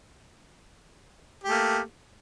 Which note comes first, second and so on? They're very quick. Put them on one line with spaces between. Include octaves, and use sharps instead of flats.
G4 A3 A#3